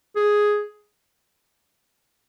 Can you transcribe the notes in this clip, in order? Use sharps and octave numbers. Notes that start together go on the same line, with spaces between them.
G#4